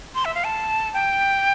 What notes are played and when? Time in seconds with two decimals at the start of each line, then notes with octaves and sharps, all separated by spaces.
0.15 C6
0.25 E5
0.35 F5
0.45 A5
0.94 G5